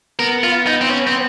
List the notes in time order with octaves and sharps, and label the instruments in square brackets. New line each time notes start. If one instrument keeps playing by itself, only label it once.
[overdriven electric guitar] B3 [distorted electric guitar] A#4
[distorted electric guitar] F4
D#4
C4
C#4
C4